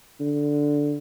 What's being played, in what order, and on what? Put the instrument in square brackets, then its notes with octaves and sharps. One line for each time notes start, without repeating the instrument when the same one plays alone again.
[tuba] D3